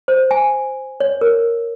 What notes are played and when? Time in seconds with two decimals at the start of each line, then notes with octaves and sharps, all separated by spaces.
0.08 C5
0.31 G#5
1.00 C#5
1.21 A#4